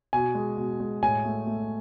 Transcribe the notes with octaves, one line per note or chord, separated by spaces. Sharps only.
B2 G#5
G#3
B2
G#3
A2 G#5
A3
A3